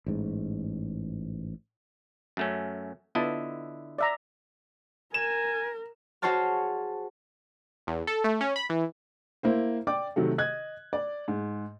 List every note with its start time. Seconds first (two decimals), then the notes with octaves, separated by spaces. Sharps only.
0.06 A1 G#2
2.37 F#2 A3 C#4
3.15 D3 B3 E4 F4 D#5 A5
3.99 D5 E5 A#5
5.14 A#4 G#5 E7
6.22 F#4 G#4 C5 C#5 A5 F6
7.87 E2
8.07 A4
8.24 A3
8.41 C#4
8.56 B5
8.70 E3
9.43 A#3 E4 C5
9.87 D5 G5 D6
10.16 C3 D#3 F#3 A3
10.38 D#5 F#6 G#6
10.93 D5
11.28 G#2